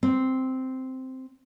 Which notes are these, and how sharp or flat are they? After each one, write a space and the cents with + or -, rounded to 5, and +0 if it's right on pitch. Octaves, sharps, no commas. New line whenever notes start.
C4 -5